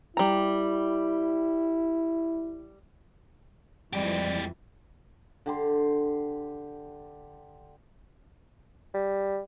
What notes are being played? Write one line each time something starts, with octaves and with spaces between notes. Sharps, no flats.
G3 E4 A#5
F2 E3 G3 G#3 G4
D3 G4 C6
G3